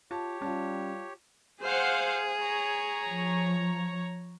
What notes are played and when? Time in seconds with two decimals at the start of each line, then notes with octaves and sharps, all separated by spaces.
0.11 F4 G4 C#5 A5
0.42 G3 C#4 F4 A5
1.63 G#4 C5 F5 F#5
2.41 C#5 A#5
3.06 F3